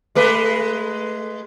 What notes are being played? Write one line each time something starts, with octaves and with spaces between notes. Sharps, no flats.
G#3 A3 B4